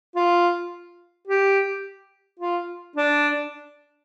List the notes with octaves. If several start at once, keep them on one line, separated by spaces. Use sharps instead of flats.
F4
G4
F4
D4